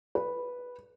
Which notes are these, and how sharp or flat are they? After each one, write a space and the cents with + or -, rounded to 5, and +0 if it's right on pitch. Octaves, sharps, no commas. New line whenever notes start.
B4 -5